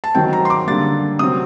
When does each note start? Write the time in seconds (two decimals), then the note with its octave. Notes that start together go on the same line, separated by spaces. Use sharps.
0.04 A5
0.15 D#3 F#3 C4 G5
0.33 A#5
0.45 C6
0.50 D6
0.67 D3 G3 A#3 A6
1.19 C3 F#3 C4 D#6